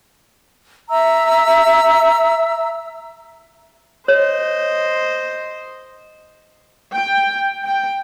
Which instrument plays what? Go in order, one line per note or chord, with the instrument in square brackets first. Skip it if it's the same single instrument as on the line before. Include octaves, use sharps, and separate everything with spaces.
[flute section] E5 A#5 E6
[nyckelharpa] C5 D#5 [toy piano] C#5
[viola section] G5
G5